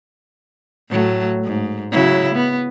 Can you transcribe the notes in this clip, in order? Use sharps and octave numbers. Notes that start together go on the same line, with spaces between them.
A2 F#3 A3
G#2
C#3 F#3 E4
B3